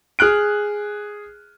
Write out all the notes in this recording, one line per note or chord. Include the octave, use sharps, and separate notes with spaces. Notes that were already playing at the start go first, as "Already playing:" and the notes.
G#4 F6 F#6 D7